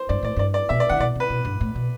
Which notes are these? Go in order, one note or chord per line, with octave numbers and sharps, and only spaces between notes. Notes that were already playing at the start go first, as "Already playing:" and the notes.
Already playing: C5
G2 D5
A2 D5
G2 D5
D5
B2 E5
D5
D3 F#5
B2 D5
C3 B4
B2
G2
A2
B2